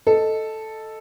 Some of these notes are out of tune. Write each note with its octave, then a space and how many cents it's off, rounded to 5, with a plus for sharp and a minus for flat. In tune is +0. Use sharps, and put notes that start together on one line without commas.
A4 +0 D#5 +0